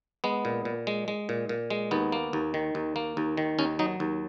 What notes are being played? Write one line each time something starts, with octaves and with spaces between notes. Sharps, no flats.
G#3 B3
A#2
A#2
G#3
G#3
A#2
A#2
G#3
D#2 B3
A#3
D#2
D#3
D#2
A#3
D#2
D#3
D#2 C#4
F#3 D#4
D#2